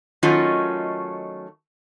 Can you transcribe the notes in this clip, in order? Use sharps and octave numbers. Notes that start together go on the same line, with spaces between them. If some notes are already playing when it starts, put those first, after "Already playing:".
D#3 F#3 A3 C#4 D#4 F4